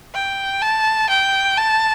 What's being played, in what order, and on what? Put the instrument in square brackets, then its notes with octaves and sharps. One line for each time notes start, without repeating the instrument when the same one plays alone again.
[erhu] G5
A5
G5
A5